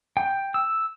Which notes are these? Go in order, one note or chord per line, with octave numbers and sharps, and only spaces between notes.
G5
E6